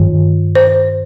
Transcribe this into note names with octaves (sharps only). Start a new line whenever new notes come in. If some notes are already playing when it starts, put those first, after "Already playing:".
Already playing: G2 D#3
C5